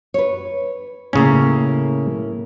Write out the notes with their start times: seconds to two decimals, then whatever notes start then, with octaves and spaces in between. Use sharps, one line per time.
0.14 B4 C#5
1.13 A2 C#3 A#3 C#4